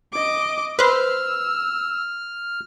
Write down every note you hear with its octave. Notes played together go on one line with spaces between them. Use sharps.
D#5 D6
B4 C5 E6 F6